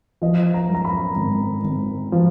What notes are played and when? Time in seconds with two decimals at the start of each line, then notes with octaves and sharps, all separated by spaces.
0.22 F3 D#5
0.54 A#5
0.69 F#2
0.75 A#5
0.85 B5
1.16 G#1
1.64 G#1
2.12 F3